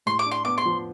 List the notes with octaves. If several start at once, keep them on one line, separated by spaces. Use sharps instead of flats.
A2 C6
D6
D4
C6
B3 D6
C6
F3